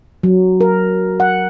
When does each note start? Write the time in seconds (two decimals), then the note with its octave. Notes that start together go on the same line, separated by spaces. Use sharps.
0.23 F#3
0.61 A#4
1.20 F#5